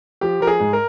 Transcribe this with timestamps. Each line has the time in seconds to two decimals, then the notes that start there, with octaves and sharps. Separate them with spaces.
0.21 F3 G4
0.41 F3 A#4
0.47 G#4
0.60 G#2
0.73 A#4